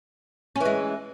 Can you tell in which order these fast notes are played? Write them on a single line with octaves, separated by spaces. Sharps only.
C#4 E3 G#3